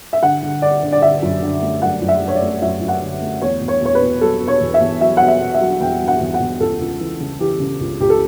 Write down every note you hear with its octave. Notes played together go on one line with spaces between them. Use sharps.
E5
D3 F#5
D3
D3 D5
D3
D5
D3 E5
F#2
D3
A3
F#2 F#5
F#2
E5
F#2
C#5
D5
A3
F#2 E5
F#2
F#5
D3
A3
E2 C#5
E2
C#5
E2 C#5
B4
B2
F#3 A4
B2
C#5
E2
E5
E2
F#3 E5
B2 F#5
E5
B2
E5
F#3
E2 G5
F#3
F#5
E2
F#5
E2
C#2 A4
C#2
E3
C#3
E3 G4
C#3
C#2
C#2 G4
A4